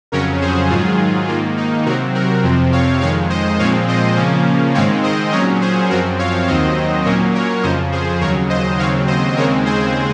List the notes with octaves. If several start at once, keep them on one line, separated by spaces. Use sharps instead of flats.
F2 C#3 F#3 C#4 A#4 C#5
G#4 C5
G#2 D#3 F#3 F4 G#4
G#2 D#3 A#3 F4
D#4
C3 F#3 C4 F#4 A#4
F#4 A#4
F2 C3 F3 C4
C#5 F5
F2 D#3 G#3 C#5 F5
C5 D#5
A#2 F3 G#3 C4 C#5 F5
C5 D#5
C#3 F3 A#3 C#4
G#2 D#3 G#3 C4 C#5 F5
C5 D#5
A#2 F#3 C#4 A#4 C#5
G#4 C5
F#2 F3 C4 F#4 A#4
C#5 F5
D#2 D#3 F#3 C4 C5 D#5
A#2 F#3 A#3 C#4 A#4 C#5
A#4 C#5
F2 C#3 F3 C5 D#5
G#4 C5
D#2 C#3 F#3 A#4 C#5
C5 D#5
D#2 C#3 F#3 C4 C#5 F5
C5 D#5
D#2 C#3 G#3 C4 A#4 C#5
G#4 C5